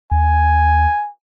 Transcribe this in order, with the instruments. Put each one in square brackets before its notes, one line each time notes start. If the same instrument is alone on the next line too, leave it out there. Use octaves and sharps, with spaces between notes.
[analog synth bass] D#2 [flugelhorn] G#5